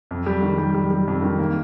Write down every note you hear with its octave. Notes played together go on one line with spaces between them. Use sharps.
F2
G3
D#3
G3
G3
G3
F2
D#3
A#3